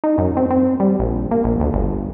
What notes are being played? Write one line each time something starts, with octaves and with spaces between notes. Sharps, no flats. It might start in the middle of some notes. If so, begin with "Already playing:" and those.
D#4
F#2
C4
C4
G3
A#1
A#3
A#1
D2
G1